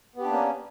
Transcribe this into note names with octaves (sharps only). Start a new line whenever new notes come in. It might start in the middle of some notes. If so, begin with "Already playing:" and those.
A#3 B3 C#4 D4 G4